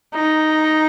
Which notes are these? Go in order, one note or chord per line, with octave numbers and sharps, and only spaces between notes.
D#4